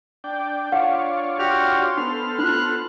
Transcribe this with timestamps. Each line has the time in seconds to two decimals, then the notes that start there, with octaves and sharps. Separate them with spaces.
0.24 D4 G5
0.72 D4 F4 C#5 F5 F#5
1.39 F#4 G4 C6 F6
1.97 B3 D4 A4 C5 F6
2.39 D4 F4 F#6